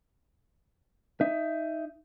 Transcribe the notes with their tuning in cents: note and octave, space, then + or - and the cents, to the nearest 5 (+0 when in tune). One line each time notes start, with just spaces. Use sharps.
D#4 +5 E5 +20